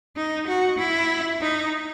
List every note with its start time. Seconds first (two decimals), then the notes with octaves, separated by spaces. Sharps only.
0.16 D#4
0.48 F#4
0.79 E4
1.41 D#4